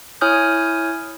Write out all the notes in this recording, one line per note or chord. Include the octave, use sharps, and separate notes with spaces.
E4 C#5 G#5 D#6 F6 G6